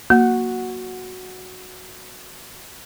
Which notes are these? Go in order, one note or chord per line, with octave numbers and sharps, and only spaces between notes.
A#3 F#4 F#5